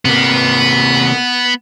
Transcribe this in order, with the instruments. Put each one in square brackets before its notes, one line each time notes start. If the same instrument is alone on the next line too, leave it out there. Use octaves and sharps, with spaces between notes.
[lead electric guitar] C3 A#3 [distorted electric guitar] B3